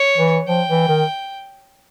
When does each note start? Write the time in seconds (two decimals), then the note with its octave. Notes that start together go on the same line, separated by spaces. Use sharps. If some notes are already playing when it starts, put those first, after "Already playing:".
Already playing: C#5
0.18 E3
0.48 F3 G5
0.69 E3
0.89 D#3